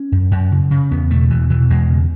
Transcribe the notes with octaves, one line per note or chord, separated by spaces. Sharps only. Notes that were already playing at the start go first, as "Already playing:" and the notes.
Already playing: C#4
F#2
F#2
C#3
C#3
E2 B3
B2 A3
E2 E3
B2 E3
E2 G#3
C#3